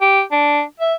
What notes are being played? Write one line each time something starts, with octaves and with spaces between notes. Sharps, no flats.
G4
D4
E5